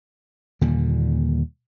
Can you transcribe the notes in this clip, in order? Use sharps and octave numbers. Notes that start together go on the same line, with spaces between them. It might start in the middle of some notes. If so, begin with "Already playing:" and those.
D#2 A#2 D3 G3